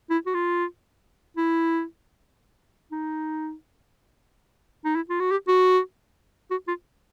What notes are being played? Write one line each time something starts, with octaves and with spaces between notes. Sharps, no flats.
E4
F#4
F4
E4
D#4
D#4
E4
F4
F#4
G4
F#4
F#4
F4